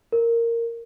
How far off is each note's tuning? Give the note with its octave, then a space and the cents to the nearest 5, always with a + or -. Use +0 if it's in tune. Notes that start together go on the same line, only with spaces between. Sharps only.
A#4 -10